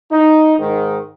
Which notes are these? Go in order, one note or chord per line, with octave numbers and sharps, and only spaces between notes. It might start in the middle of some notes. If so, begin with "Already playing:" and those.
D#4
G#2 D#3